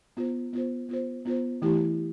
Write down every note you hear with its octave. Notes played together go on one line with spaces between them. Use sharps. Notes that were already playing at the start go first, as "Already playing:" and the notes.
B3 F4 C5
B3 F4 C5
B3 F4 C5
B3 F4 C5
E3 A3 E4 G4